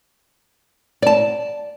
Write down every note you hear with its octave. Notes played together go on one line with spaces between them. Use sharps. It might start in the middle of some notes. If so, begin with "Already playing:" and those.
D5 A5